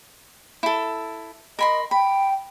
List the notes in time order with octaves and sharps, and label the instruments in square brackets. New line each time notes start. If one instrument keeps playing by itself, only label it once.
[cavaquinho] E4 A4
[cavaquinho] A#4 B5 C6 [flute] D#5
[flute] G5 [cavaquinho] B5